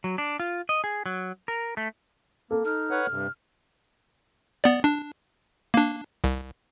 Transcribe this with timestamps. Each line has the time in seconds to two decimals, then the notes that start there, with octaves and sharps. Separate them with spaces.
0.04 F#3
0.18 D4
0.40 F4
0.69 D#5
0.84 G#4
1.06 F#3
1.48 A#4
1.77 A3
2.51 A#3 A4
2.65 D#4 F6
2.90 B4 C#5 F#5
3.09 G2 C3
4.64 B3 D5
4.84 D4
5.74 A#3 D4
6.24 C2